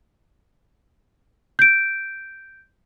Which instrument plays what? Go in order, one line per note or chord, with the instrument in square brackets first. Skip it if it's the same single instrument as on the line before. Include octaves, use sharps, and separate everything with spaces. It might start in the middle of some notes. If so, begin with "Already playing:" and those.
[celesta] G6 D7